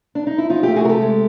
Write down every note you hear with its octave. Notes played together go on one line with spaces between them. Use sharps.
D4
D#4
E4
F3 D#4 F4
A3 F4 G4
F#4 G#4
C3 G4 A4 A#4
G#3